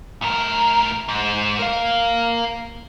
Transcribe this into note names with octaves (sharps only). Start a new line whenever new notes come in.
A2 A#4
G#2
A#4 F5